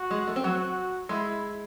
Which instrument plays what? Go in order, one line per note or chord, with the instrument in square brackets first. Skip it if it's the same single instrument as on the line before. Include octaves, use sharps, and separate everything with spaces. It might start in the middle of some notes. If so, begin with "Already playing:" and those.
Already playing: [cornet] F#4
[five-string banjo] G#3
A3
C4
[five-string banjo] F#3 [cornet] F#4
[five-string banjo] G#3 [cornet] E4